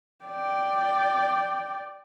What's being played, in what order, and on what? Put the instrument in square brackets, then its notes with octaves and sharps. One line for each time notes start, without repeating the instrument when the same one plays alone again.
[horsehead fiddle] D5 G5